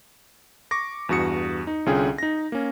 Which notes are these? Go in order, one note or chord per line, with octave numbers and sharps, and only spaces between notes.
C#6 D6 A#6
E2 G2 F#4 D#6 C#7
D#4
C2 D3 C#4 F4 G#4 G5
D#4 A#6
A#3 C#4